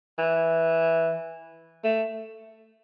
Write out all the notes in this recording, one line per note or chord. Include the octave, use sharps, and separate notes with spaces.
E3
A3